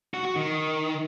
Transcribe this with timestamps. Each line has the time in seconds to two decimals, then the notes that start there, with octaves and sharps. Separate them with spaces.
0.14 F#4
0.25 F#4
0.36 D#3